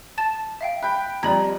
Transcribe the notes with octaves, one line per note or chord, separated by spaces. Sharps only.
A5 A6 E7
E5 F5 G5
G5 B5 F#6
F2 G3 D5 A#5 B5 G#6